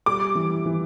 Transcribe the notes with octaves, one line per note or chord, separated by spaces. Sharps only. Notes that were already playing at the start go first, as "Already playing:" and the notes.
G3 D6
E3
E3